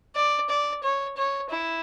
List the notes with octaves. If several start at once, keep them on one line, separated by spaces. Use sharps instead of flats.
D5
D5
C#5
C#5
E4